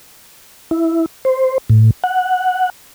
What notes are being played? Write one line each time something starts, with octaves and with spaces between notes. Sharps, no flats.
E4
C5
A2
F#5